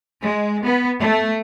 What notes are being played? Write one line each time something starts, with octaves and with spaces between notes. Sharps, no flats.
G#3
B3
A3